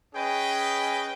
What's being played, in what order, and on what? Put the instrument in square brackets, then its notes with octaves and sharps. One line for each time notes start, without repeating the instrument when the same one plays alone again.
[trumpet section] C#4 G#4 B4 D#5 G5